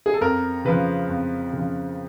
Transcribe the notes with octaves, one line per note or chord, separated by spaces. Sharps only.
G#4
A4
F2 A#4
C#3 F3 B4
F2
C#3 F3